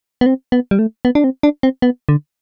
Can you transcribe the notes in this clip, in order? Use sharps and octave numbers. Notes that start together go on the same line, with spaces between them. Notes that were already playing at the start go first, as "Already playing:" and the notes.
B3
C4
B3
G3
A3
B3
D4
C4
D4
C4
B3
D3